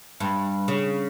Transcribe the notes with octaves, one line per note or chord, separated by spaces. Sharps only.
G2
C#3